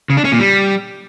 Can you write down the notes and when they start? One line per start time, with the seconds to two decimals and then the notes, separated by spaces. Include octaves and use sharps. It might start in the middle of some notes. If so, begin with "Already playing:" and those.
0.10 C#3
0.17 D4
0.25 C#4
0.32 A#2
0.40 G3